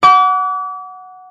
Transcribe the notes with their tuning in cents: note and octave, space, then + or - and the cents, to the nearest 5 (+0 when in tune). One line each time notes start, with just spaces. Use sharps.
F#5 +0 D6 -35